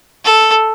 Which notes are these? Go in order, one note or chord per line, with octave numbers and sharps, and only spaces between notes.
A4